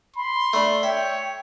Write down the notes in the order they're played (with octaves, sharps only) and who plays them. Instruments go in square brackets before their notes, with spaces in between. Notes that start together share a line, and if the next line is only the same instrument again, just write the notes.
[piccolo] B5 [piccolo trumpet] C6
[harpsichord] A3 D4
[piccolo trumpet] C#5 [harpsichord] E5 [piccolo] G5